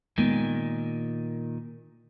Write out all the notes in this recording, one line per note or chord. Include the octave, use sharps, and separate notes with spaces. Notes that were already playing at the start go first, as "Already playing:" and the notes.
A#2 D#3 G#3 B3